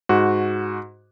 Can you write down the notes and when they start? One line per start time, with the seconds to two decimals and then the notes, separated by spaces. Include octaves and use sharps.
0.09 G#2 F#4